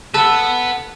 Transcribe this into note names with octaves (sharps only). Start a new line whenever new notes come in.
A4 B4 F#5 A5 E6